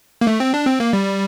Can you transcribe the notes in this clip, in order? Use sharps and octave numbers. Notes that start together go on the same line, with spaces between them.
A#3
A3
C4
D4
C4
A#3
G3